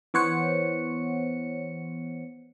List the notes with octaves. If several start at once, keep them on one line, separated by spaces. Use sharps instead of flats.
E3 B3 C5 C#5 F#5 C#7